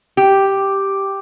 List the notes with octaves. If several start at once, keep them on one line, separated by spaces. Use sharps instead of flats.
G4